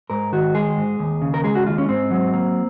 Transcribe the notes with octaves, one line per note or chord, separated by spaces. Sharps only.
G#2 A#4
D#3 F#4
G#3 G#4
G#2
D#2
C#3
A#4
G#3 G#4
F#4
D#2 F4
C#4
G#2 C4
F#3
A#3